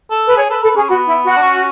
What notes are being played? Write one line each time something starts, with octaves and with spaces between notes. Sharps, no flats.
A4
B4
G#4 C#5
A4 B4
A4 B4
C#4 G#4
B3 F#4
E4
F#4
D4
C#4